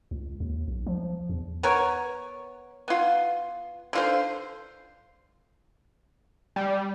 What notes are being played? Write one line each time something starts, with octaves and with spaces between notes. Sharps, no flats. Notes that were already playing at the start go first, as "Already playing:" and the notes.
C#2
D#2
B1
F3
E2
B3 A#4 C#5
B3 F4
D3 F4 C5
G3